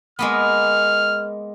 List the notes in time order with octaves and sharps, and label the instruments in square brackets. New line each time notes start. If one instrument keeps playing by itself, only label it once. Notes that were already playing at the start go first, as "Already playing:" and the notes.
[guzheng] G#3 A#3 B3 [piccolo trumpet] F6